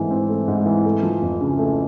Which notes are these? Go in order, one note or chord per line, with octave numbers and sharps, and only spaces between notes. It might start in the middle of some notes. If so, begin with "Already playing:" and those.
Already playing: G#2 E3 A3 C4
C4
A3
G#2
E3
A3
F3
F2
C#3
A3